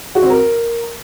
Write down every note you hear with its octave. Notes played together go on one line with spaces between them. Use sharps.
F#4
C4
A#4